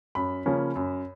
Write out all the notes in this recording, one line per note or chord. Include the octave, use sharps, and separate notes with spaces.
F#2 B5
C#3 F3 A#3 C#4
F#2